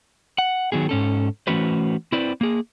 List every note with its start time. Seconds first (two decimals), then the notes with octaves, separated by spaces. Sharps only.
0.38 F#5
0.72 D#3 F#3 B3 G#4
0.89 G#2 C#4 A4
1.47 E3 A3 C#4 F#4 B4 C5
2.12 C4 E4 B4 C5 D5
2.41 A#3 G#4